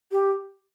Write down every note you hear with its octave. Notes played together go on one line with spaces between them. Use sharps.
G4